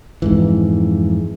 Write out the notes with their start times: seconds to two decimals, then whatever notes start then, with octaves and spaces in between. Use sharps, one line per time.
0.22 F2 G#2 E3